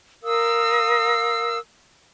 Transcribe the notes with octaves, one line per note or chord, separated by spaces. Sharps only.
A#4 F5 D#6 E6